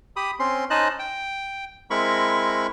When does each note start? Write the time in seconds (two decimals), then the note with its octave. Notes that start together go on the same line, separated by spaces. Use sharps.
0.16 G4 B5 D#6
0.40 C4 C#4 C6
0.70 C#4 D#4 C5 D#5 A5 F#6
0.99 G5
1.90 G#3 C4 E4 A#4 B5 C#6